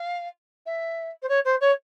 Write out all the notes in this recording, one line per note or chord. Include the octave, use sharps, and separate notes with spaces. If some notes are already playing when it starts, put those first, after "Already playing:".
Already playing: F5
E5
C5
C#5
C5
C#5